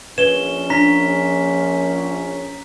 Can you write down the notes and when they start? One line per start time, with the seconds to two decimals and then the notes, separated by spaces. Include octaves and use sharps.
0.18 A#1 C#4 B4 E7 G7
0.70 D4 A#5 B6